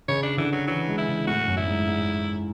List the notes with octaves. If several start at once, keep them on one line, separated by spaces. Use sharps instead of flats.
C#3 C#5
D4
D3 E3
F#3
E3 F#3
G#3
E4
C#3
A2 F#4
F#2
E4
G#2
G#2